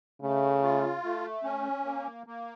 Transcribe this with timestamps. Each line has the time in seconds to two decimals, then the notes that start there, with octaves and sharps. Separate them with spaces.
0.22 C#3 A3
0.63 F4
1.04 A3
1.44 C#4
1.85 A#3
2.26 A#3